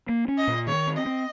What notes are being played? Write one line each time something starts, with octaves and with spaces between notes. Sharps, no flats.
A#3
C#4
D#5
A#2
D#3 C#5
C4
D#5
C4